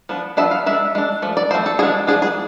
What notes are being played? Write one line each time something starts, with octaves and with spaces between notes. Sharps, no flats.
F3 B3 D4
F3 B3 D4 E5
F5
G#3 D4 E5
G#3 D4
F3 A3
D5
F3 A3 C4 C5
A4
F3 G#3 D4 G#4
F3 G#3 D4 G#4
G#4